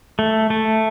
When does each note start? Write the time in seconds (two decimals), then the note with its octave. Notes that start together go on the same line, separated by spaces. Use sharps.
0.19 A3
0.50 A3